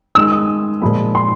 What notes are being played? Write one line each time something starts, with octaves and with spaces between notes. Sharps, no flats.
D#3 G#3 E6
D#6
A#2 F3 G#3 B5
C6